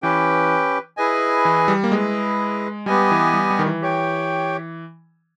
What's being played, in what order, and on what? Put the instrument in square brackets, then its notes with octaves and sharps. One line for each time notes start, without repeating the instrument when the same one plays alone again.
[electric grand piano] E3 [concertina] C#4 G4 B4 G5
[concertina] E4 G#4 B4 D#5 G#5
[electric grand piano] E3
G3
A#3
[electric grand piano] G#3 [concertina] E4 G#4 B4 D#5
[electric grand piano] G3 [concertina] B3 G4 B4 D#5 G#5
[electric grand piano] E3
G3
G3
D#3
E3
[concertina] G4 C#5 G5